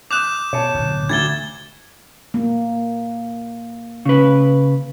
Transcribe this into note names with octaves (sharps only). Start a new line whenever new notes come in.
D6 D#6 F#6 G6 E7 F7
B2 C#5 A5
D1 B2
D2 G#6 A6 G7
A#3
C#3 B4